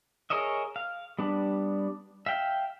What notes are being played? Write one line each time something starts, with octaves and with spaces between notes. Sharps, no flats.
G#4 A#4 C#5 D#5 E5
F5
G3 B3 D4
E5 F5 G5